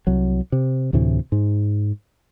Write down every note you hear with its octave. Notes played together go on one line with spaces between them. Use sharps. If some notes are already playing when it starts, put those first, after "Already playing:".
C2 F#3
C3
D2 A2 C3 E3
G#2